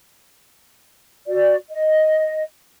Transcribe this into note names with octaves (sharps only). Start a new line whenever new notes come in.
F#4 D5
D#5